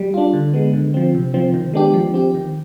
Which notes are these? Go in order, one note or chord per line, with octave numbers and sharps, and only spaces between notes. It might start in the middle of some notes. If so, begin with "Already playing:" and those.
Already playing: G3
D4 F4
D3
G#3 B3
D3
F3 C4
C3
F3 C4
D#3
G#3 B3 D4 G4
F3
C4 G4
D#3